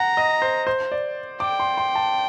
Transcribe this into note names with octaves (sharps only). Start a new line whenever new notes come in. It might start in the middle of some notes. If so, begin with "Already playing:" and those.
Already playing: F#5 A#5
D#5
C5
C5
D5
G5 D6
C6
C6
A5